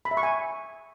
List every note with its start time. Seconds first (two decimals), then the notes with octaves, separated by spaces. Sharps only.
0.05 B5
0.11 E5
0.17 C#6
0.23 G#5